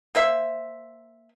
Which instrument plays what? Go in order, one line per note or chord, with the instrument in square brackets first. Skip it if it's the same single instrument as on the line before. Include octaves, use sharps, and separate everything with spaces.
[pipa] A#3 C5 E5